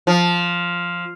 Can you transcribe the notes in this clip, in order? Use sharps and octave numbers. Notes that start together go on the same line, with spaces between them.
F3